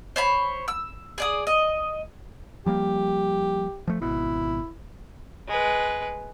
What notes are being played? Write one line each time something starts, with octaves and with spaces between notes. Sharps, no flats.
C5 C#5 B5
E6
G#4 D5 D#6
D#5
F3 G3 A#3 G4
F3 A3
G#1 B2 E4
G#3 B4